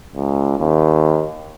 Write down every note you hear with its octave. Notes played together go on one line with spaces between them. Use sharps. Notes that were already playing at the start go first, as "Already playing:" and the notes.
C#2
D#2